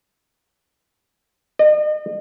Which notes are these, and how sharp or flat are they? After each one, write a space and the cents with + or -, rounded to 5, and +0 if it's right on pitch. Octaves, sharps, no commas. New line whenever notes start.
D#5 -40